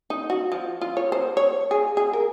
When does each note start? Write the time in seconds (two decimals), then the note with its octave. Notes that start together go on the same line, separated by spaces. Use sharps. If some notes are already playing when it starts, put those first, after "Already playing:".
0.10 D#4
0.30 F#4
0.52 F3
0.81 F4
0.97 C#5
1.12 C5
1.37 C#5
1.71 G#4
1.97 G#4
2.13 A#4